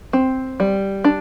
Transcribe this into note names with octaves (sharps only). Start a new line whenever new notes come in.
C4
G3
D4